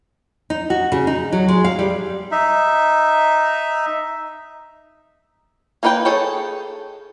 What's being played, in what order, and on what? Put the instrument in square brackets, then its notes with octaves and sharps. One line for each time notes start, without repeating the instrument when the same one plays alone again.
[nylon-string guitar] D#4
F#4
C#3
D#4
F#3
G#3
F5
G3
[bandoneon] D#4 E5
[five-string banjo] A#3 D#4 B4 D#5 G5
G#4 A4 C#5 G5